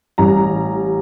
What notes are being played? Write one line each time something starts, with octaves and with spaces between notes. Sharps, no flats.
A1 G3 A#5